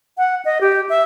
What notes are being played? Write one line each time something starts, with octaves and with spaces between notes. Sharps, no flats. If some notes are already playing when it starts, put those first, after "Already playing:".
F#5
D#5
G4
E5